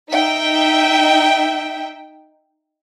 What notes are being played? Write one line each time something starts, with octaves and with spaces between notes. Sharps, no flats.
D#4 E5 G5